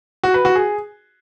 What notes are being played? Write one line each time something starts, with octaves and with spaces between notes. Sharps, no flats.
F#4
B4
F#4
G#4